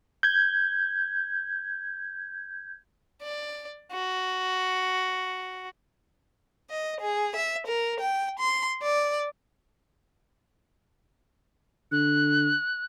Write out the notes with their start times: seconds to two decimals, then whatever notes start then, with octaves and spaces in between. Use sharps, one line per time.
0.23 G6 G#6
3.22 D5
3.93 F#4
6.70 D#5
7.01 G#4
7.36 E5
7.67 A#4
8.00 G5
8.40 C6
8.82 D5
11.92 D3 F#6